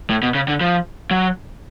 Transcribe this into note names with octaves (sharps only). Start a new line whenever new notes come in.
A2
B2
C#3
D3
F3
F#3